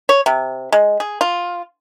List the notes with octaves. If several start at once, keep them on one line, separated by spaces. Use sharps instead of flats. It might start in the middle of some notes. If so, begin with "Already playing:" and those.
C#5
C3
G#3
G#4
F4